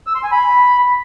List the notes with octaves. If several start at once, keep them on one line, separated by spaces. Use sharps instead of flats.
E6
C6
G#5
B5